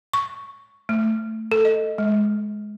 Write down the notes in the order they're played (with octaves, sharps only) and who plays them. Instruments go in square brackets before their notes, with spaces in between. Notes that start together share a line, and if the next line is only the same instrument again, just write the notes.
[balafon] C#6
A3
A4
D#5
G#3